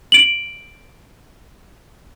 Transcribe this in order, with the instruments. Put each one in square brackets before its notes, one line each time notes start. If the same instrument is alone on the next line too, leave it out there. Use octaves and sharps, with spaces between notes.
[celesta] D7 F#7